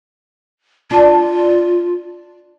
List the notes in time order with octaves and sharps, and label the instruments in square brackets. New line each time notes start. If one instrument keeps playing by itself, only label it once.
[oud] D4 [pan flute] F4